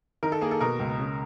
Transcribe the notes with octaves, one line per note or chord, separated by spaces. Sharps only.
D#3 A#4
A4
A#3 G#4
A4
B2 A#4
C#2
C#3